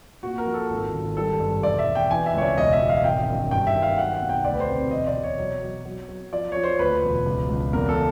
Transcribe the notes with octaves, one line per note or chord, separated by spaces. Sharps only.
A#2 F#4
A#4
F3
A4
G#1
G#1
G3 A4
G2
E1 D5
E5
E1
G5
E3 G#5
E5
C#2 C#5
D5
E1 D#5
E5
E1
F5
G#1 G5
F#2
G2 G5
E5
D#3
F5
F#3 F#5
F#5
B1
G5
D2 D5
B4
C5
C3
E1 D#5
D5
E1
C#5
F#3
F#3
F#3
F#3
F3 D5
F3 C#5
C5
D2 B4
E1
C#2
C#2
E2 A#4
A4
C#3